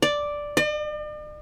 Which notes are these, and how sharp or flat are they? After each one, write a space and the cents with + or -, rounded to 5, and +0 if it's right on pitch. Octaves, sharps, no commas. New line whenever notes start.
D5 +0
D5 +45